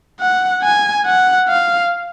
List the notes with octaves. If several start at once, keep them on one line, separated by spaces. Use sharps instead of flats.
F#5
G#5
F#5
F5